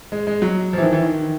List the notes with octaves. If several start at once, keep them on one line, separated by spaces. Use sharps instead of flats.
G#3
G#3
F#3
E3 F3
D#3
E3
D#3